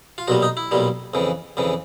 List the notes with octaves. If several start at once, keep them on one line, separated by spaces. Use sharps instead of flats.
F4
B1 A#2 G3 F#4
D#4
E4
B1 A#2 G3
F2 C#3 E3
F2 C#3 E3